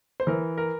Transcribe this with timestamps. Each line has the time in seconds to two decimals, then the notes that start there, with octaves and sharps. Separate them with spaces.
0.20 C5
0.27 E3 A#4
0.58 A#4